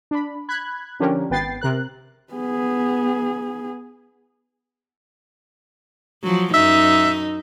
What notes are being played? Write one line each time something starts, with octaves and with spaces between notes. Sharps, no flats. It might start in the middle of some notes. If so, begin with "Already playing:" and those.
D4 B5
B5 F#6 G#6
D3 F3 C#4 D4 G4 A#4
G#1 B3 B4 G5 A6 C7
C3 A#4 F#6
B3 G#4
F3 F#3
F#2 D#4 E5